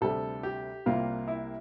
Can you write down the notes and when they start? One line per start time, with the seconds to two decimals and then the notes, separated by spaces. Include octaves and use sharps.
0.01 D2 C3 G3 A4
0.43 G4
0.86 C2 C3 G3 A#3 F4
1.28 E4